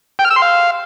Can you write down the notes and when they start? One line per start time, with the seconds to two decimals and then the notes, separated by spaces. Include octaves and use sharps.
0.19 G5
0.25 F6
0.30 E6
0.36 C6
0.42 F5